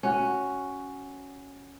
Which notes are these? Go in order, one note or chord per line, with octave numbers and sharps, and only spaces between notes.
C#4 F#4